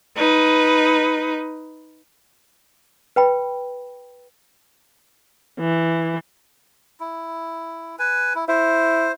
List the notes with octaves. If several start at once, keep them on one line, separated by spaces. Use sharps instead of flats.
D#4 B4
B4 G5 B5
E3
E4
B4 G#5
E4
E4 C5